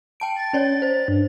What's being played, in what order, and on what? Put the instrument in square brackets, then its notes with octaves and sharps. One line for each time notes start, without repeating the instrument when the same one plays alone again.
[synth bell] G5 A5 D7
[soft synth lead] A6
[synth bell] C#4 C#5 D5
C5
[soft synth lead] G2